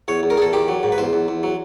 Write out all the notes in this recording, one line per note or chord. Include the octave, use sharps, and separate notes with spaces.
E2 C#5
E2
A#4
E2 G#4 A4
D#3 G4
F#3
G#2
B4
E2 C5
E2
E2
F#3